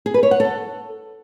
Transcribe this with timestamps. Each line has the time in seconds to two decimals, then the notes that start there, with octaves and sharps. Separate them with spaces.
0.06 G#4
0.14 B4
0.23 C#5
0.31 F#5
0.40 A4